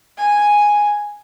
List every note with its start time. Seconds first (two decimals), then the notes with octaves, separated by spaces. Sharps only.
0.18 G#5